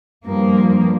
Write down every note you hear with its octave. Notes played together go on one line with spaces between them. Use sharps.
G2 F3 A#3